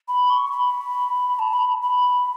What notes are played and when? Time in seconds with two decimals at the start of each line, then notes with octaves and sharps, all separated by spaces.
0.08 B5
0.30 C#6
0.52 B5
1.39 A5
1.53 B5
1.82 B5